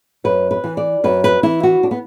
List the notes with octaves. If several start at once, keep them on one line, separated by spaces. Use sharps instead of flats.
F#2 B4
B4
E3
D5
F#2 B4
B4
E3 E4
F#4
D4
B3